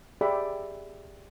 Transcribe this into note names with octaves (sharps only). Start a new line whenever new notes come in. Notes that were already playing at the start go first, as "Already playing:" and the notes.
G4 G#4 D5 E5 B5